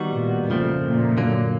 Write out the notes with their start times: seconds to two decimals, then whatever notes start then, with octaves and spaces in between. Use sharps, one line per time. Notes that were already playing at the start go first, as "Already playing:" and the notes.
Already playing: D#3 G3 B3 D#4 F#4
0.13 A#2
0.48 F2 A#2 C#3 F3 A3 C4
0.83 A#2
1.17 F#2 D3 F#3 A#3